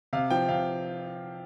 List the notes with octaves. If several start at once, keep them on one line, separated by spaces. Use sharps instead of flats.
C3 F5
F3 G5
C3 F5